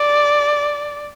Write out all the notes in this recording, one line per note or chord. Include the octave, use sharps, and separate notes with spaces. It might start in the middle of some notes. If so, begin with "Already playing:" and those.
Already playing: D5